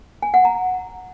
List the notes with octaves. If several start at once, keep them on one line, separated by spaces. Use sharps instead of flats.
G#5
F#5
A#5